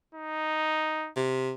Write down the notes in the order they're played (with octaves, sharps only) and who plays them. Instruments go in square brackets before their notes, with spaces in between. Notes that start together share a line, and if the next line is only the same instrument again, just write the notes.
[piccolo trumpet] D#4
[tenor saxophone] C3